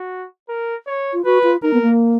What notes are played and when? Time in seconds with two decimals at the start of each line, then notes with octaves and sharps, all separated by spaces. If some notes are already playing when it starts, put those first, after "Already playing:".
Already playing: F#4
0.49 A#4
0.87 C#5
1.13 F4
1.25 F#4 B4
1.43 F4
1.63 D#4 A#4
1.73 B3
1.82 A#3